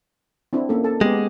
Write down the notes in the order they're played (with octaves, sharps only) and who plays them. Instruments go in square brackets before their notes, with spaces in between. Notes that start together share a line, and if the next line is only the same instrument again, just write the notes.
[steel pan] C4 D4 E4
A#3 C#4 A4
A4 A5
[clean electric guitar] G#3 [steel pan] B3 G4